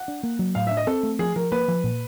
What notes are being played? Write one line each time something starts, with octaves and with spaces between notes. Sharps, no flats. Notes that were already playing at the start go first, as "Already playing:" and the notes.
Already playing: F#5
D4
A#3
F#3
A2 F5
E5
D4
D#5
C4 A4
A3
F3 G#4
F3 A#4
A#3 B4
F3
A#2